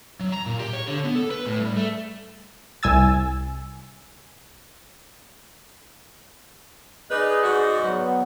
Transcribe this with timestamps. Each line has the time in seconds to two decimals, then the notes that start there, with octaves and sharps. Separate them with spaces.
0.20 F#3
0.32 A#5
0.46 A#2
0.59 G4
0.73 C#5
0.87 D3
1.04 B3
1.15 A4
1.31 B4
1.46 A2
1.60 G3
1.76 A3
2.83 C2 G#5 E6 A6
7.11 D#4 G#4 B4 D5 D#5
7.44 G#2 F#4
7.82 F#3 B3